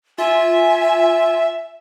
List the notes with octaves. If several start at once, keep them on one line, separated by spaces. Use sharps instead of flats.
F4 E5 G#5